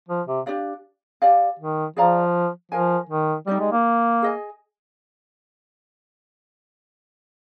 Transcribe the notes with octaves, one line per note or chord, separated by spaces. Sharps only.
F3
C3
D4 G4 D5 F5
G4 D5 F5 G#5
D#3
F3 G#4 D5 F5 A#5
F3 A#4 F5 G#5
D#3
G3 D#4 G4 D5
G#3
A#3
G#4 D#5 G#5